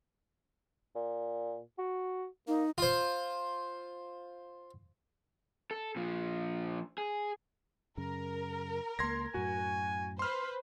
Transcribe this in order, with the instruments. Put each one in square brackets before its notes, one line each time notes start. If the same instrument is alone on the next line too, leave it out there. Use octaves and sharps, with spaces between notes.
[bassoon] A#2
F#4
[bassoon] A#3 [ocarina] D#4
[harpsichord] F4 C5
[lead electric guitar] A4
A#2 F3
G#4
[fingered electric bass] F#2 C#3 [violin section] A#4
[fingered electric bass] C#2 A#3 [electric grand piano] C6 G#6 A#6
[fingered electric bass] F#2 A2 [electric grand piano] F#4 [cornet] G#5
[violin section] B4 C5 [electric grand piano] C6 F6